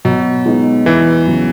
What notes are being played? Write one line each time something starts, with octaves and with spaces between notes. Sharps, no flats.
B2 F#3
G#3 B3 D#4
E2 E3
C#3 F#3 B3